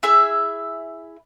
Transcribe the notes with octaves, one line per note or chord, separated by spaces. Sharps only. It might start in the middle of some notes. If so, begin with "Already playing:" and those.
E4 G#4 E5